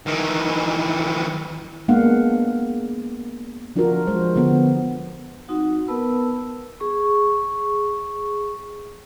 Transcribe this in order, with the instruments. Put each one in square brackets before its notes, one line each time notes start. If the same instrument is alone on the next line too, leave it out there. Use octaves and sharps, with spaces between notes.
[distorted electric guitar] D#3 E3
[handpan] G#3 A#3 B3 D4 F5 F#5
F3 D4 F4 F#4 A#4
F3 G#3 C5
D3 B3
[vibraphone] F#3 C4 D#4 F#4 F#5
B3 A#4 B4 A5 B5 E6
G#4 C#6